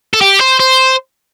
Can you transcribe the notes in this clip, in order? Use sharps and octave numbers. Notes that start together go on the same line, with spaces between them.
A4
G4
C5
C5